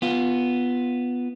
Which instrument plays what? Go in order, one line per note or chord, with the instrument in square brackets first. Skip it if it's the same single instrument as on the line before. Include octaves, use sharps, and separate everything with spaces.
[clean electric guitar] B3 F4